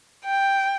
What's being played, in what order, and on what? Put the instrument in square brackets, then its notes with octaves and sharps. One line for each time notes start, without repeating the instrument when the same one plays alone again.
[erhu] G5